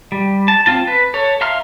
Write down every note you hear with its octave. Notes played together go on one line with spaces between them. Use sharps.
G3
A5
C4 F4 A5
B4
A4 C#5
E5 F5 A#5 C6 F6